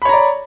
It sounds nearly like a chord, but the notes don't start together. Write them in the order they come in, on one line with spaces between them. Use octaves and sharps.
B5 C#5 A#5 D5